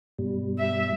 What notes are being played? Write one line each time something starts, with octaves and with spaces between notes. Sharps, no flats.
G2 B2 G3
E5